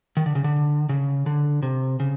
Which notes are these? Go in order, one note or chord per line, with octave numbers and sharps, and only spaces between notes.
D#3
D3
C#3
D3
C#3
D3
C3
C#3